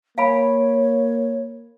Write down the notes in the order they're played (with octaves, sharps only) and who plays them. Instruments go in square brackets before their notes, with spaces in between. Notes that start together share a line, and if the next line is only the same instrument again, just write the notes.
[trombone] A#3 [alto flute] C#5 [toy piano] F5 G#5 B5